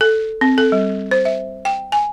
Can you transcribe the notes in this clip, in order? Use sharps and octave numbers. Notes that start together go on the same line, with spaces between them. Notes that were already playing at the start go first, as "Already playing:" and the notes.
A4
C4
A4
G3
C5
E5
G5
G#5